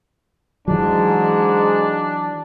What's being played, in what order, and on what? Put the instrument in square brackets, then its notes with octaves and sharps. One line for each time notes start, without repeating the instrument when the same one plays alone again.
[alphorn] G#2 [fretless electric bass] E3 F#3 [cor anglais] D4